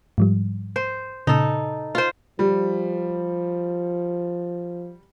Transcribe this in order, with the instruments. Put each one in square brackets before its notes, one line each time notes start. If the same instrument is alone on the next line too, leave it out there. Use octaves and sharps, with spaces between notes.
[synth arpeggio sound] G#2 F3 G3
[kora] C5
[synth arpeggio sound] A#2 C#3 [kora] D#4 A4
[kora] F4 C5
[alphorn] F3 [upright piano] G3